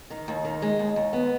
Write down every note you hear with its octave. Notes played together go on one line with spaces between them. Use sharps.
D#3
D#2
D#3
G#3
D#2
D#2
B3